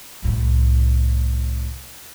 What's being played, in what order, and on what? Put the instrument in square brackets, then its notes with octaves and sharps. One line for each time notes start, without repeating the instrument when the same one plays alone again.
[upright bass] C2 A2